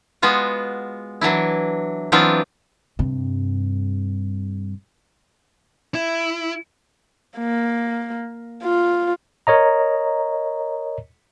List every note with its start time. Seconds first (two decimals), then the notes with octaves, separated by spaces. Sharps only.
0.22 G#3 B3 F4 F#4
1.21 E3 F#3 D4 E4
2.12 E3 F#3 B3 C4 D4 F4
2.99 G2 C3
5.95 E4
7.38 A#3
8.63 F4
9.47 A#4 C#5 D#5 A#5